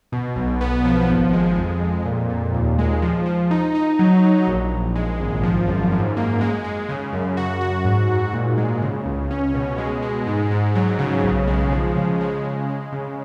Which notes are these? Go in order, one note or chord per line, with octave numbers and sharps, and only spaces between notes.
B2
B1
B3
F3
G#1
G#3
F2
F2
A#2
A#2
D#2
G#3
F3
F3
D#4
D#4
F#3
F#3
A#1
A#1
G#3
G#1
F3
F#2
G#2
A#3
G#3
G#3
C#3
F#2
F#4
F#4
G#2
G#2
A#2
G#3
C#3
C#2
C#4
B2
G#3
G#3
G#2
G#2
F#3
C#3
B1
G#3
F3
C#3
G#3
G#3
G#3
C#3